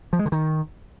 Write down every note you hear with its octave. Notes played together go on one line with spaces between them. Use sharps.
F3
G#3
D3
D#3